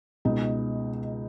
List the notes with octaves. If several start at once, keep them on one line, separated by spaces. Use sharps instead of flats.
C#2 B2 D#4